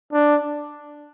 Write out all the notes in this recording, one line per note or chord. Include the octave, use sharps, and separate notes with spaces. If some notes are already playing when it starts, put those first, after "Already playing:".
D4